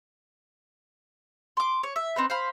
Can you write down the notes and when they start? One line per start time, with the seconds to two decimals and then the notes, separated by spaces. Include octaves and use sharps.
1.57 C6 D6
1.83 C#5
1.96 E5
2.16 C4 D#4 B4
2.30 C5 F5 B5